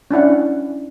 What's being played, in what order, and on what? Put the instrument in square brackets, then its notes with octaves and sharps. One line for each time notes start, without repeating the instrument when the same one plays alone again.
[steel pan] C#4 D4 E4 F#5